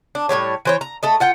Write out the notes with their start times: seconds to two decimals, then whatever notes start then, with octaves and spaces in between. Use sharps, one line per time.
0.15 D4
0.29 A2 F3 G3 C#5
0.65 E3 C5 C#5
0.81 A#5
1.03 A3 A4 D#5
1.20 F4 F#5 G5